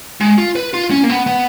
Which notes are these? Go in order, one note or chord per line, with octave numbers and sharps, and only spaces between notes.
G#3
F4
B4
F4
C#4
A#3
B3
B3